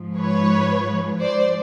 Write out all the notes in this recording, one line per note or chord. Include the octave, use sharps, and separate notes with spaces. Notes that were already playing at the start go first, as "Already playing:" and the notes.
Already playing: G#2 F3
B4 C#5
G#2 F3 C5 D5